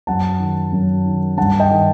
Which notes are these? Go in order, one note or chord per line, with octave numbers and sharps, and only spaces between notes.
F#2 F#5 A5
D#3
F#2
D#3
G2 F#5 A5
D#5 G5
D#3